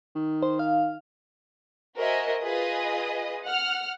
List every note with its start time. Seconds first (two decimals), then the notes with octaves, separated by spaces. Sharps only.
0.16 D#3
0.42 C5
0.59 F5
1.97 F#4 A#4 C5 D#5 E5 G#5
2.42 F4 G#4 B4 D#5 D#6
3.44 F#5 F6